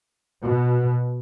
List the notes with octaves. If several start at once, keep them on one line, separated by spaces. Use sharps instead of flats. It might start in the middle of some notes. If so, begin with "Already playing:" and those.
B2